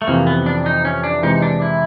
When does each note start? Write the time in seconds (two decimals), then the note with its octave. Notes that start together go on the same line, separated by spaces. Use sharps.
0.02 A3
0.07 F2 C3 E3 A#3
0.27 B3
0.46 D4
0.66 D#4
0.85 C#4
1.04 D4
1.23 C3 E3 G#3 D#4
1.42 D4
1.62 E4